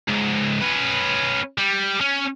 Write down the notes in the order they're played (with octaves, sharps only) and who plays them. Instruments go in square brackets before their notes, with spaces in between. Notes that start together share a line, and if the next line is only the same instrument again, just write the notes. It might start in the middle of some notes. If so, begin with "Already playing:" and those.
[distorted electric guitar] C#2 G#2
C#4 B4
G3
C#4